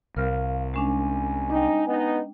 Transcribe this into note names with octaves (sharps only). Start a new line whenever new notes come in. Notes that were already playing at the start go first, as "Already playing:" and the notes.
C2 A#4 F5 F6
G#3 C#4 D4 G#5
D4 D#4 G5
B3 D#4